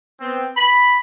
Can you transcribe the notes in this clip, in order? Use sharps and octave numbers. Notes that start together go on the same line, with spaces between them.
B3 C4
B5